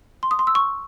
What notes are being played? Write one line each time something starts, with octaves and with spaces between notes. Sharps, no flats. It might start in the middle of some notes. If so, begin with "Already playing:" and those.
C6
D#6
C6
E6
C#6